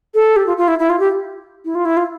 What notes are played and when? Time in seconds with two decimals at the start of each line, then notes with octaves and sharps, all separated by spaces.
0.14 A4
0.36 G4
0.46 F4
0.57 F4
0.67 E4
0.78 E4
0.89 F4
0.99 G4
1.64 E4
1.74 F4
1.85 E4
1.96 F4